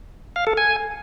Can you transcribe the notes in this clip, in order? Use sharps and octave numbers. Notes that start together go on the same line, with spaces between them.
F5
A4
G#5